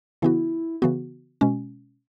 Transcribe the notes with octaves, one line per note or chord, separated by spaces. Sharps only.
C#3 E3 B3 E4 F#4
C#3 E3 B3 F#4
B2 G#3 C#4